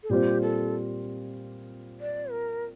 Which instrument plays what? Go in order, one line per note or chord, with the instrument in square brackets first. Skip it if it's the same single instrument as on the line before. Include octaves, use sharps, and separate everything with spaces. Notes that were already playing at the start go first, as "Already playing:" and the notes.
[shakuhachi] A4
[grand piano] A#2 G3 C4 F4 C5 [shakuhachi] G4
[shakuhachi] A4
D5
A#4